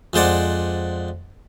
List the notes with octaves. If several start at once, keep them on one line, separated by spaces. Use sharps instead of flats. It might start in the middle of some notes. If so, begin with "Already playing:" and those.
F2 G#3 C5 D5 F#5